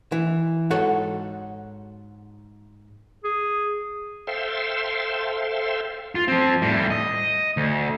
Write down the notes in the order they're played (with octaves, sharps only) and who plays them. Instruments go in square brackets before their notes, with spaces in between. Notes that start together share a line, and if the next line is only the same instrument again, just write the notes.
[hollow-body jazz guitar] E3
G#2 F#4 A4 C#5 F#5
[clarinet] G#4
[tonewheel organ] A4 C5 E5 F5 G5 C6
[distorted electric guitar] F4
F3 C4
A2 G3
D#5
D2